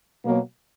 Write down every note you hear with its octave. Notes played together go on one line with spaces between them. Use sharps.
B2 F#3 A#3